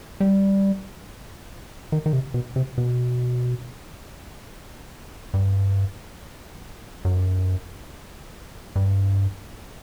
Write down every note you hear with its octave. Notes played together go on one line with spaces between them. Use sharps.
G3
D#3
D#3
C3
B2
C3
B2
G2
F#2
G2